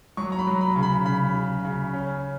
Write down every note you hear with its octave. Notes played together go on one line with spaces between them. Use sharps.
F#3 C#6
A#5
B5
F#3
B5
C#3
B5
C#3 B5
C#3
C#3
C#4